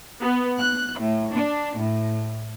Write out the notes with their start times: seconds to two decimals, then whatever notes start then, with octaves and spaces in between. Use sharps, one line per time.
0.21 B3
0.58 F#6
1.00 A2
1.32 D4
1.77 A2